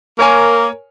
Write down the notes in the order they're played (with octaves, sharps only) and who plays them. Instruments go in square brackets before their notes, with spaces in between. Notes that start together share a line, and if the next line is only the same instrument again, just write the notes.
[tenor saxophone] A#3 [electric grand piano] A#4 C#5 G#5